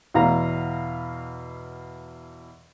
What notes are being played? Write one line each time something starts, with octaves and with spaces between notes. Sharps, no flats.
E2 B2 F5 A#5